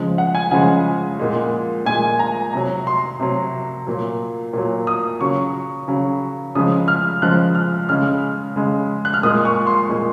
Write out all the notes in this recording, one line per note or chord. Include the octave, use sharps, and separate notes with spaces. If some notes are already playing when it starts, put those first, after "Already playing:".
Already playing: C#3 F3 G#3
F#5
G#5
C#3 F3 G#3 F#5
A#2 G#3
A#2 G#3 G#5
A#5
C3 F#3 A#5
C6
C3 F#3
A#2 F#3
A#2 F#3
D#6
C#3 F#3 C#6
C#3 F#3
C#3 F3 G#3 D#6
F6
C#3 F3 G#3 F#6
F6
C#3 G#3 F6
C#3 G#3
F#6
F6
A#2 G#3 D#6
C#6
C6
A#2 G#3